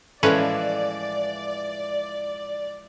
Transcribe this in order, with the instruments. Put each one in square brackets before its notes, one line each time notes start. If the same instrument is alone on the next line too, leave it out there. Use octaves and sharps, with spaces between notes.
[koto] A2 C#4 B4 [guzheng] E3 F3 G#3 [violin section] D5